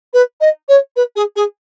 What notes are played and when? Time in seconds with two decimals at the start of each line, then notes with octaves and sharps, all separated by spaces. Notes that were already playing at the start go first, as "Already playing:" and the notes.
0.14 B4
0.41 D#5
0.69 C#5
0.96 B4
1.16 G#4
1.36 G#4